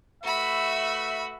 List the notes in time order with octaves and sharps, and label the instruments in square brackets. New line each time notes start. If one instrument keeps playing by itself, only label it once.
[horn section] A3 B4 E5 [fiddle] F#4 B5